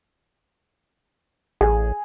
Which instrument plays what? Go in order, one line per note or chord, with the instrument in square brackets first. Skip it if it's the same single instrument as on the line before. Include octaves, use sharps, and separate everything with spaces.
[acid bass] A1 [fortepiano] G#4